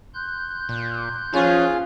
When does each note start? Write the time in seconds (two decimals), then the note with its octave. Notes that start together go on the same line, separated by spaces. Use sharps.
0.14 C6 F#6 G6
0.69 A#2
1.34 F3 C#4 F4 G#4